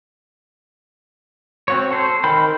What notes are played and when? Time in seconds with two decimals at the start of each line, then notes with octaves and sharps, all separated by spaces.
1.68 C4 F#4 C#5
1.91 A4 C5
2.24 D#3 A#4 G5 B5 G6